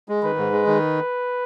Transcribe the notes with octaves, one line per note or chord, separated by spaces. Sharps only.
G#3
D#3 B4
G#2
G#3
D#3